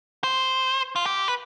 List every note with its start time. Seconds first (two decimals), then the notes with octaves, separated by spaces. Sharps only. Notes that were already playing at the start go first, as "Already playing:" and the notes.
0.24 C5
0.96 F4
1.06 G4
1.28 B4